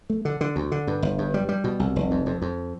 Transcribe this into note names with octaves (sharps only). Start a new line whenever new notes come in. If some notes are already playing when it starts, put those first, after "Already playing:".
A3
D3
D3
D2
D3
G2
G1
G2
G3
G3
B2
C2
F1
F2
F2
F2